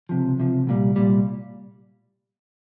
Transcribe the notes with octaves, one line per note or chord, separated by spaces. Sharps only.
C#2 C3 F3
C#2 C3 F3
C2 A#2 G3
C2 A#2 G3